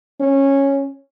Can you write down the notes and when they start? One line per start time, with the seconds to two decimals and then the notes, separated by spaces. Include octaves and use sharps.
0.21 C#4